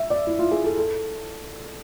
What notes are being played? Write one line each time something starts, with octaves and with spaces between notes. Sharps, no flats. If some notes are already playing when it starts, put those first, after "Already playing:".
Already playing: E5
D5
E4
F4
G#4
A4
A4